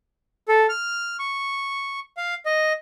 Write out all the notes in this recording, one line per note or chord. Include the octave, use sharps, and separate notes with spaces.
A4
F6
C#6
F5
D#5